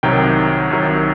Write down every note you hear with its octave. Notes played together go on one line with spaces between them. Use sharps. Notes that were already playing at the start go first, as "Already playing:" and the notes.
C2 C3 D#3 F#3 G5
C2 C3 D#3 F#3